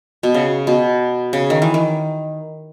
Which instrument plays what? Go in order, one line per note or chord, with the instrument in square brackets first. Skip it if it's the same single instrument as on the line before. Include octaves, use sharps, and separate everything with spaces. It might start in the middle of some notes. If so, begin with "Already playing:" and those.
[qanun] B2
C#3
B2
C#3
D#3
E3
D#3